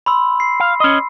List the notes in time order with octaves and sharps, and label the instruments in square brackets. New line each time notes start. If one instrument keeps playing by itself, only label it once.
[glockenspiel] B5 C6 E6
C7
[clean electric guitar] F5
C#4 D#5